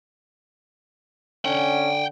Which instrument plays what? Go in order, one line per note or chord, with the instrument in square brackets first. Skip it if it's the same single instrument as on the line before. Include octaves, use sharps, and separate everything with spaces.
[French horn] D3 [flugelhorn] C#4 [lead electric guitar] F#5 G5